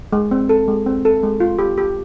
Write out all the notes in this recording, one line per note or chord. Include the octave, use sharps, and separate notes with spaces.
G#3
C4
A4
G#3
C4
A4
G#3
F4
G4
G4